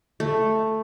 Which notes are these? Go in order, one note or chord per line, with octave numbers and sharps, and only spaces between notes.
A3